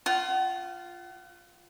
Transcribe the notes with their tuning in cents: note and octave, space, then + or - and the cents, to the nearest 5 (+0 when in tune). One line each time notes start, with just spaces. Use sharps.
F4 +0 F#5 +40